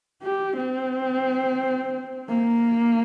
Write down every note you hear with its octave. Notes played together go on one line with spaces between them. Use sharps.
G4
C4
A#3